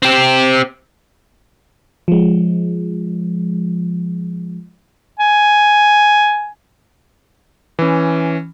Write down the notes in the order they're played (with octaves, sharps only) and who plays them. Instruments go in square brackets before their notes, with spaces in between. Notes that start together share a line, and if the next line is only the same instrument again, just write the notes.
[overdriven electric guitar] C4 G4
[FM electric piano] F3 G#3
[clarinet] G#5
[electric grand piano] E3 C#4